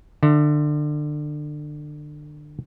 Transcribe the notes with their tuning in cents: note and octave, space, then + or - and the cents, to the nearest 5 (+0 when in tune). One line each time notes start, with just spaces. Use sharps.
D3 +25 E5 +35